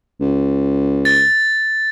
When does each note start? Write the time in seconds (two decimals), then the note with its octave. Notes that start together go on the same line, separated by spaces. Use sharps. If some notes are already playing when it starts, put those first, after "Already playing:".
0.21 C#2
1.05 A6